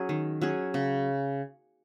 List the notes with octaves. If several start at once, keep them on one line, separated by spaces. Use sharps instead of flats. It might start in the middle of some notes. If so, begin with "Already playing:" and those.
Already playing: F#3 C#4 G#4
D#3
F#3 C#4 G#4
C#3